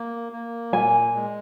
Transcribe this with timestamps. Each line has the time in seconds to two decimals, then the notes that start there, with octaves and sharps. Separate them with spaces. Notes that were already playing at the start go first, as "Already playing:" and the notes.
Already playing: A#3
0.32 A#3
0.73 A#2 G#5
1.15 G#3